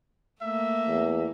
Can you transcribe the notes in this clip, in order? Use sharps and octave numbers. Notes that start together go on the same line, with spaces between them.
A3 A#3 E5
E2